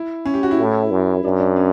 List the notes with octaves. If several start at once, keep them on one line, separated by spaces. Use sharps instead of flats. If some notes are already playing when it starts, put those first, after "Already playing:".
Already playing: E4
C#4
G4
F#4
E4
A2
F#2
F#2 D4
D4
C#4